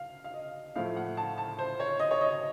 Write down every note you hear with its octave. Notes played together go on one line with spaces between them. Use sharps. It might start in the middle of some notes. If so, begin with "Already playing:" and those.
Already playing: F5
F5
D#5
A2 F3 A3 F5
F#5
A5
A5
C5
C#5
D#5
C#5
D#5